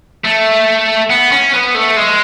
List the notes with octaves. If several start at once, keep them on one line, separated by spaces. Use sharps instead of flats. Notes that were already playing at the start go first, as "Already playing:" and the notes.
A3
B3
C#4
B3
A3
G#3